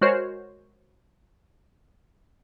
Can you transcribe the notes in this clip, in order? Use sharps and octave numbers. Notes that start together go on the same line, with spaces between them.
G#3 F#4 A#4 C5 C#5